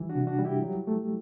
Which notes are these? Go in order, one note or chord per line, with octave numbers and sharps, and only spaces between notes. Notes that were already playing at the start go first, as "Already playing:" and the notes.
Already playing: E3 G3
D4 F#4
C3
D4 F#4
G3
E4 G4
F#3
A3